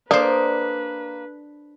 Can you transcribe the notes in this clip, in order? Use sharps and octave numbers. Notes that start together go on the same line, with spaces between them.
A#3 D4 A4 B4 C5 D5 D#6